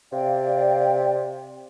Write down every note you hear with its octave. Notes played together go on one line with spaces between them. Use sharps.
C3 D5 F5 G5